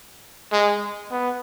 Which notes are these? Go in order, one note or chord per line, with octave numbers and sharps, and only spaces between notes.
G#3
B3